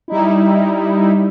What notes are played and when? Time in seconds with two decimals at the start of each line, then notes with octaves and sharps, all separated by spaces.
0.08 G3 D#4 E4